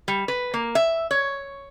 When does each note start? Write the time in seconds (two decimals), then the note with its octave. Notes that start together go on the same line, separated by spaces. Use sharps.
0.08 G3
0.28 B4
0.54 A#3
0.75 E5
1.11 C#5